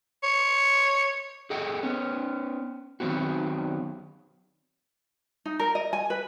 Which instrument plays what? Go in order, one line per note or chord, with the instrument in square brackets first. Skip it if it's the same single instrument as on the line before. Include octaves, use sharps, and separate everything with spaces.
[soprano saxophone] C#5
[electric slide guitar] G#4 A4 D#5 F#5 G5
B3 C#4
D#3 F#3 B3 C4 F#4
[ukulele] D#4
A#4
D#5
G#5
B4